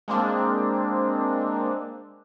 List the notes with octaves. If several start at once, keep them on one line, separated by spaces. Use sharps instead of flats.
G#3 A#3 C4 D4